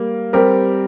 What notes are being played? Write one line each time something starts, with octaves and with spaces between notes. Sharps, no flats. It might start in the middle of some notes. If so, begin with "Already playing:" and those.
Already playing: G3 A#3
G3 C4 G4 A#4